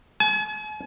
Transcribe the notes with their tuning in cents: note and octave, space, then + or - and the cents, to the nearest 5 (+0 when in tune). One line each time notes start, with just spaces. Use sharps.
G#5 +45